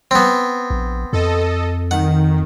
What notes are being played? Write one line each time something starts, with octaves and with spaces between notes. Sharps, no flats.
B3 C4
A#1
F2 A4 D#5
D#3 F#5